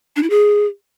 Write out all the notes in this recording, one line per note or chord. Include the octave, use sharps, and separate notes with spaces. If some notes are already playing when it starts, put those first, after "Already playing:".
D4
E4
G#4